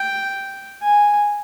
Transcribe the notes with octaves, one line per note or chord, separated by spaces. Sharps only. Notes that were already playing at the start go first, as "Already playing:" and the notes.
Already playing: G5
G#5